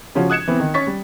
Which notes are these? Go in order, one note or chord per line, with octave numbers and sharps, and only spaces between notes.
C#3 F3 C#4 F4 F#4
D#6 F#6 G#6 C#7 E7
E3 B3 C4
D#3
C#4 C#6 A6 B6
G3